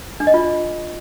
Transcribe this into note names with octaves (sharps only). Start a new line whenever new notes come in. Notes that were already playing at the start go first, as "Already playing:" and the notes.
D4
D#5
F4